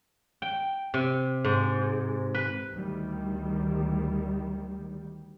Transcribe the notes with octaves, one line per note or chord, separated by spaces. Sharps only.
G5
C3
G#2
B4
D2 D#3 G3